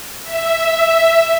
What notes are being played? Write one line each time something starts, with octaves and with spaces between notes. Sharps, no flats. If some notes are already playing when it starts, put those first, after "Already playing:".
E5